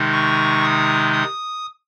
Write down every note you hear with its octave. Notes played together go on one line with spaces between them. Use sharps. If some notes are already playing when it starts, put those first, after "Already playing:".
Already playing: C3 D#3 G#3 D#4
C#6
D#6
D#6